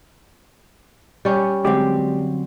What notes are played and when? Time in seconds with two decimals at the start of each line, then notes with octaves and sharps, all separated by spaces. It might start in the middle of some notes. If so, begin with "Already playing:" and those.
1.25 G3 C#4
1.65 D3 F#3 G#3 C4 G4 D5